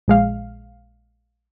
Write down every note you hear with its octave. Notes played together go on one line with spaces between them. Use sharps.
A#1 G#3 F5